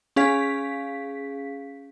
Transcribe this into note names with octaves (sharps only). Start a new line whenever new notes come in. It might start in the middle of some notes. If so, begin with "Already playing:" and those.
C#4 G#4 F5 B6